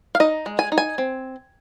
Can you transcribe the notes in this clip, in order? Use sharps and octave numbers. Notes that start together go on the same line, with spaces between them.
F5
D#4 D#5
G#3
G#5
D#4
G#5
C4